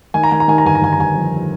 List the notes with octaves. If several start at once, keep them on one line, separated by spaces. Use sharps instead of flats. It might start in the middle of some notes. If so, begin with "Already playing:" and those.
D#3 G#5
A#5
D#3 G#5
A#5
D#3 G#5
A#5
G1 G#5
A#5
G1 G#5
A#5
G1 G#5
F2